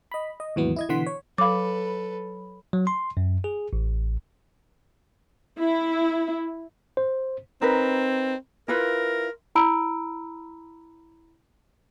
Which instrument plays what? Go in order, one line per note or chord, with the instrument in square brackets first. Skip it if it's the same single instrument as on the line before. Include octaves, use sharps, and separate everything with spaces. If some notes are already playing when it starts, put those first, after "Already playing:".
[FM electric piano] D#5 B5
D#5
D#2 G#2 E3 F#3 B3
E4 D#5 G#6
B2 D3 E3 F#5 C6 B6
C#5
[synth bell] F#3 B5 [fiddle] A4 B4 [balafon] F5 D6
[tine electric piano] F#3
C6
F#2
G#4
A1
[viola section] E4
[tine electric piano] C5
[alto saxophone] C4 [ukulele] D#4 A#4 B4
[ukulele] E4 F4 B4 [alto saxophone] A#4
[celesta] E4 A#5 B5 E6 D7